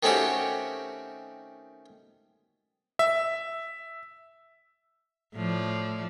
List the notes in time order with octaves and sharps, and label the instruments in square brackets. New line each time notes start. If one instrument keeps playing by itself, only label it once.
[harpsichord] D#3 A3 C4 C#4 F#4 G4
[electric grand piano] E5
[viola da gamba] A2 F3 D5